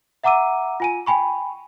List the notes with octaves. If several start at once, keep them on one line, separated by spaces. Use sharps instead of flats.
E5 F#5 A#5 D6 E6 D#7
F4 G#5 D#7
G5 G#5 B5 C#6